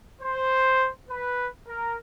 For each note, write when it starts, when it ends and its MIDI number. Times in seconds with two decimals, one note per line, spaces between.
0.22 0.89 72
1.08 1.48 71
1.68 1.97 70